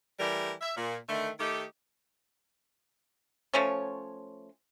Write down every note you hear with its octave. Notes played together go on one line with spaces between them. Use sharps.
E3 G3 A3 G4 A#4
E5
A#2
D3 D#3 A3
D#3 A3 D#4 G4
F3 A3 C#4 C#5